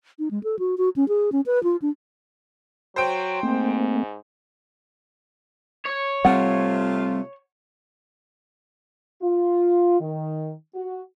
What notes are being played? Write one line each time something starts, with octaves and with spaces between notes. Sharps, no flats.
D#4
G#3
A4
F#4
F#4
C#4
G#4
C#4
B4
F4
D4
F#3 C5 G5
G#2 A3 A#3 C4
C#5
C3 G3 A3 C4 F4 F#5
F4
D#3
F#4